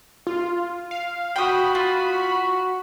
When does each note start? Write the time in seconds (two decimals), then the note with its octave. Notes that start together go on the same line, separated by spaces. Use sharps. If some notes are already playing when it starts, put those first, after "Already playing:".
0.27 F4
0.91 F5
1.36 F#4 G5 B5 D#6
1.75 F4